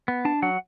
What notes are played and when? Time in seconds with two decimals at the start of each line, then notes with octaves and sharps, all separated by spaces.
0.08 B3
0.25 D4 A5
0.42 F#3 F#5